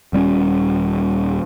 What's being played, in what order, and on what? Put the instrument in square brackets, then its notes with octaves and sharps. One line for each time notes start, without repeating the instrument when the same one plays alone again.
[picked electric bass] D#1 G3 B3 C#4